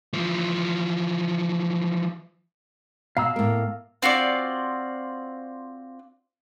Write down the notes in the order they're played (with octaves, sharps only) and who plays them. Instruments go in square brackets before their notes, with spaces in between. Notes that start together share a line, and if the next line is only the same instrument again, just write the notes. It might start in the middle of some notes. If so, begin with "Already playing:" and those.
[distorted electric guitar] E3 F3
[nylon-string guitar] B2 [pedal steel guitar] F5 A#5 E6
[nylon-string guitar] A2 A#3
[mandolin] C4 F4 F#4 D5